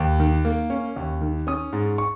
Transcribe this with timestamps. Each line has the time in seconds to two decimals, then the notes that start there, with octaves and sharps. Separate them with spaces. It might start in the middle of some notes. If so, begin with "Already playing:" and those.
Already playing: D#2
0.20 D#3
0.45 A#3
0.70 C#4
0.96 D#2
1.21 D#3
1.47 C#4 D#6
1.73 G#2
1.98 C#6